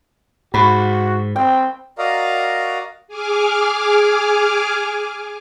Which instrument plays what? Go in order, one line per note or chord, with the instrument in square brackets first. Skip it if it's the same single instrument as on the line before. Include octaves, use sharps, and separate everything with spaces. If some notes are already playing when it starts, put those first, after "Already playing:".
[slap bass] G#2 [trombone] F#4 [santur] B5
[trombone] C4 [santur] G5
[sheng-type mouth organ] F#4 A#4 D5 D#5 F5 A#5
[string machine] G#4 G#5 D6 F6